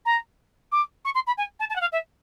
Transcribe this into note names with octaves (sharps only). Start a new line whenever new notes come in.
A#5
D6
C#6
C6
B5
G#5
A5
A5
F#5
F5
E5